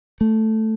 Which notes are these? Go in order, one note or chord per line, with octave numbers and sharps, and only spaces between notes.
A3